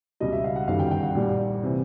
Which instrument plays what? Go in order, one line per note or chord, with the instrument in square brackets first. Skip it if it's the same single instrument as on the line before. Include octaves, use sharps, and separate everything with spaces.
[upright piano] C#2 B2 G3 D#5
E5
F5
F#5
G1 F#2 D#3 G3 F5
G5
G5
F#5
A#1 A#2 G3
C3 E3